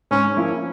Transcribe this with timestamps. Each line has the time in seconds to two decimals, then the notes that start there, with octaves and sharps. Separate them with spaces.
0.11 G#2 C#4
0.36 F3 A#3 C#4 E4